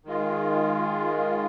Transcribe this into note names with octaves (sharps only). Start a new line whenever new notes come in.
D#3 G#3 F4